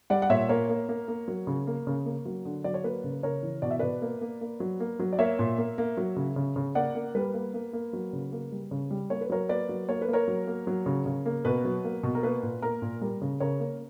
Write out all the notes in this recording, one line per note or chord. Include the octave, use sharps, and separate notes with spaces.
G3 D5 F#5
F#5
A#2 C#5 E5
A#3 A#4 C#5
A#3
A#3
A#3
F#3
C#3
A#3
C#3
A#3
F#3
D3
F#3 D5
C#5
A#3 B4
C#3
C#3 A#4 C#5
E3
B2 D5
E5
B2 B4 D5
A#3
A#3
A#3
F#3
A#3
F#3
D5
A#3 C#5 E5
A#2
A#3
A#3
F#3
C#3
C#3
C#3
A#3 D5 F#5
A#3
G3 B4
A#3
A#3
A#3
F#3
C#3
A#3
G3
C#3
G3
A#3 C#5
B4
F#3 A#4 C#5
A#3 B4 D5
F#3
A#3 C#5
B4
A#3
A#4 C#5
F#3
A#3
F#3
C#3
C#3
A#3
B2 B4
F#3
A#3
B2
A#4
A#3 B4
A#2
A#3 A#4
A#2
G3 A#4
C#3
C#3 A#4 C#5
A#3